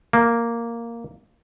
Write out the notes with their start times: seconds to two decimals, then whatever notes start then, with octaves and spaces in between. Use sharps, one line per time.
0.13 A#3